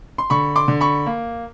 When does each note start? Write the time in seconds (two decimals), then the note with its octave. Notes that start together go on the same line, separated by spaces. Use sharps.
0.18 C6
0.30 D3 B5 C#6
0.56 C6 D6
0.68 D3
0.81 B5 C#6
1.06 A#3